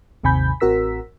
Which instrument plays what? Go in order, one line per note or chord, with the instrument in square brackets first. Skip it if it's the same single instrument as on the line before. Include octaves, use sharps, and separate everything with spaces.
[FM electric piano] G#1 D#2 C3 G#5 B5 G6
A1 C4 F#4 A#4 E6 B6